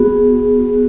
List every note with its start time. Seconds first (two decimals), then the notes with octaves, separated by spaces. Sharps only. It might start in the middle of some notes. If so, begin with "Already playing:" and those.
Already playing: B3 F#4 G#4
0.74 F#4